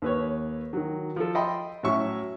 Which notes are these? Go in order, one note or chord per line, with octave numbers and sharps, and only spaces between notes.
D#2 B4 C#5
D#3 F#3
F3 A4
D#5 G5 B5 C6
A2 F#3 C#4 E5 C#6